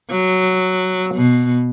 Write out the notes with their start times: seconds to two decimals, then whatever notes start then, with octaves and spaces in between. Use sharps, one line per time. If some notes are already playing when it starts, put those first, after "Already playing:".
0.10 F#3
1.15 B2